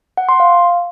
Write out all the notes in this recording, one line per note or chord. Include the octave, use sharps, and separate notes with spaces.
F#5
C6
F5